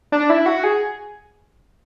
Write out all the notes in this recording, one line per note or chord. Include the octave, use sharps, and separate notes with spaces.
D4
E4
F#4
G#4